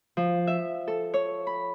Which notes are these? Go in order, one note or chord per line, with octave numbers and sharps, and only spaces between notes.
F3
E5
A4
C#5
B5